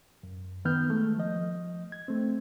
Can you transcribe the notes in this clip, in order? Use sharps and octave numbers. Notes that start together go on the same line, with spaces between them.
F#2
D#3 B3 F6 G6
G#3 A3
F3 D#5
G#6
A3 C4